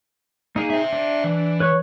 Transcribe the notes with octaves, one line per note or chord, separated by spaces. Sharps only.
A#3 D#4 G#4
C5 E5
D4
E3
B4 C#5 C#6